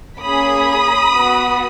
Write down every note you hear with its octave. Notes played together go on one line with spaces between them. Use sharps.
A#3 C#4 G#4 B5 D#6
B3 F#4